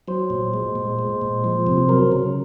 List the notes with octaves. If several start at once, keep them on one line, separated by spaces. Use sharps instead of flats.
F#3 C5
A#2
G#3
A#2
G#3
A#2
F3
C3
F#3 A#4
C#3